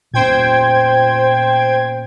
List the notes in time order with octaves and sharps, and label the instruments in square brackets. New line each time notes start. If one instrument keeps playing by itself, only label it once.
[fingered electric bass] A#2 B3 C#4 [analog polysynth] C5 G5 G#6